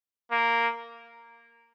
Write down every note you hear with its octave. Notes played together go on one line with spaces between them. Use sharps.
A#3